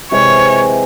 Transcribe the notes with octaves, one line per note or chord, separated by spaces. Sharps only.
C3 E3 G#3 C#5